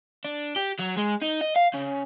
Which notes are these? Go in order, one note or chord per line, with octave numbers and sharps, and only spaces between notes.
D4
G4
F#3
G#3
D#4
D#5
F5
C#3